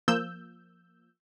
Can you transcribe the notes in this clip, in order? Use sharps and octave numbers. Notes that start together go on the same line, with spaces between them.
F3 A#3 E6 G6